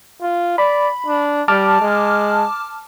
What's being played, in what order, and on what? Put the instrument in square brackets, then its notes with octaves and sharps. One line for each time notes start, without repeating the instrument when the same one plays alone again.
[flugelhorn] F4
[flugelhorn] D5 [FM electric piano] B5
[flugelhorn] D4
[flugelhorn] G3 [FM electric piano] A5 D6 F6
[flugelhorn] G#3